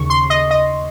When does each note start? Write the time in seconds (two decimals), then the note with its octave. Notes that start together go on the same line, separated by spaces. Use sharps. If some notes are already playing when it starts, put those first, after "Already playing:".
Already playing: D#2 C#3 C#6
0.10 C6
0.30 D#5
0.51 D#5